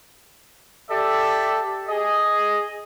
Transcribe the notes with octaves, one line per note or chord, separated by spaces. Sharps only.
G4 A4 D5 E5
G#4 D#5